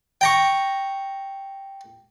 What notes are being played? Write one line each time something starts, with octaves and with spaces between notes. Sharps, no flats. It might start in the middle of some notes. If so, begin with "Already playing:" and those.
G5 A#5 C#6